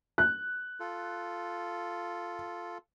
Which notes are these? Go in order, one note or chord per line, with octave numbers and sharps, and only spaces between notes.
F#6
F4 A4